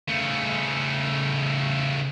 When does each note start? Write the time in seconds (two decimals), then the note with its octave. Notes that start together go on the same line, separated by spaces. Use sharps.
0.08 C#3 A3